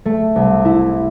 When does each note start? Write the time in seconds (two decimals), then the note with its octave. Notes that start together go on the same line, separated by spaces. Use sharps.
0.05 A3
0.35 C2
0.65 E4